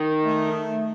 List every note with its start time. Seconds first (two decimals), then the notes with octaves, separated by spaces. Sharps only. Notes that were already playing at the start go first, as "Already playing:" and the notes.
Already playing: D#3
0.24 A3